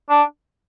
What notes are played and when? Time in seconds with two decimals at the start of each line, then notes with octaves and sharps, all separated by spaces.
0.10 D4